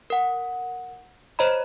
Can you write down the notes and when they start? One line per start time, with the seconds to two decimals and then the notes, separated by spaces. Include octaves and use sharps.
0.10 A#4 F#5
1.39 C5 C#5 D#5 A#5 B5